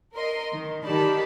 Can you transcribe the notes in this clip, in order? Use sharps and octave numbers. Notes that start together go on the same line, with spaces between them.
A#4 D#5 C6
D#3
D#3 D#4 G4 D5 A5 B5